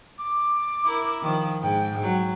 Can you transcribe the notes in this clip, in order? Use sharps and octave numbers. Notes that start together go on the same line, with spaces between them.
D6
E4 A#4
D#3 F3
G#2 G5
F#3